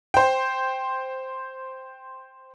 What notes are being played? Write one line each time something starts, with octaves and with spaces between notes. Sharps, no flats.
C5 G5